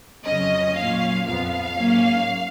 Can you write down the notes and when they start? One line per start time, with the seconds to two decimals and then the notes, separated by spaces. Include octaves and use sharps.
0.24 F2 C#3 F#3 C#4 D#5
0.75 A#2 F#3 C#4 F5
1.26 F2 F3 B3 F5
1.76 G#2 F#3 A#3 C#4